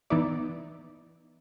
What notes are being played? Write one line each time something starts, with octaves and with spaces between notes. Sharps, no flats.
E3 B3 D#4 E4 D5